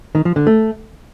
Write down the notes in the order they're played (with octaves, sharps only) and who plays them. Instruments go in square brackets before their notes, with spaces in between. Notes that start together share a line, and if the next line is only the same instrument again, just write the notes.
[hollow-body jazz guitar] D#3
F3
D3
A3